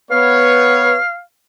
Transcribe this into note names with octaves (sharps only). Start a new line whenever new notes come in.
B3 B4 C#5 F5